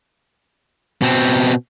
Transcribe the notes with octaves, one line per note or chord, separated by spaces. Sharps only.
B2 C4